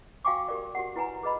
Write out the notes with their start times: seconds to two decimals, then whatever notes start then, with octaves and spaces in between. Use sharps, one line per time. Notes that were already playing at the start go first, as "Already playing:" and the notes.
0.25 F#4 F5 G5 G#5 C#6 D6
0.49 G4 A#4 D5
0.75 F#4 G4 F#5
0.96 E4 B4 F#5 G#5 A#5
1.23 G#4 B4 D#5 B5